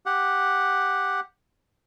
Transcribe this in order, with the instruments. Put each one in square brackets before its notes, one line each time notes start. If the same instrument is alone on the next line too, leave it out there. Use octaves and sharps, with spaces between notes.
[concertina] G4 F#5